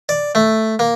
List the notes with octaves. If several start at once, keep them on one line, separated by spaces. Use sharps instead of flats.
D5
A3
A#3